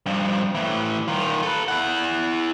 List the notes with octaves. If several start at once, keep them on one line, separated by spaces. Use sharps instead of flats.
G2 F3
A2 E3
D#3 F4
A4 B4
E4 F#5